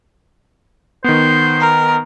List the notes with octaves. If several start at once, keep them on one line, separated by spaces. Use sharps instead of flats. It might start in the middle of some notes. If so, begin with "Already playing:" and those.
D#3 B3 C5
A#4